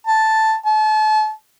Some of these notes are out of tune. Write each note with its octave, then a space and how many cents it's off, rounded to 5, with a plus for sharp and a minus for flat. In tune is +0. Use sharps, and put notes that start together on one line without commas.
A5 +0
A5 -35